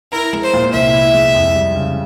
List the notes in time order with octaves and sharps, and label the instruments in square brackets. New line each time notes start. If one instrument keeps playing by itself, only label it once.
[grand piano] E4 [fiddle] A#4
[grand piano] G#3
[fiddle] C5
[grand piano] A#2
[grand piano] C2 [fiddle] E5
[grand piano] E4
G#3
F2
G3
C#3